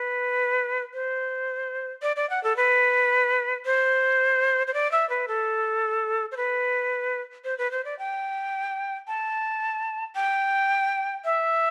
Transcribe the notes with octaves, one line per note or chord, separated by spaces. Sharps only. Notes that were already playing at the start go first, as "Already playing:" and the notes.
Already playing: B4
C5
D5
D5
F#5
A4
B4
C5
C5
D5
E5
B4
A4
C5
B4
C5
B4
C5
D5
G5
A5
G5
E5